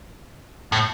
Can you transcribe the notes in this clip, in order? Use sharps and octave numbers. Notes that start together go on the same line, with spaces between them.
A2